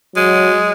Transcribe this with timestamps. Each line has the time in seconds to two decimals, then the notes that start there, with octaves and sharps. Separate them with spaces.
0.16 F#3 G#3